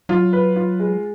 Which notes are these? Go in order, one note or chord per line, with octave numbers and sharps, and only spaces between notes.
F#3 F4
B4
F4
G#3